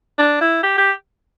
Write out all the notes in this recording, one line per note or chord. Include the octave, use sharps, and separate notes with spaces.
D4
E4
G4
G4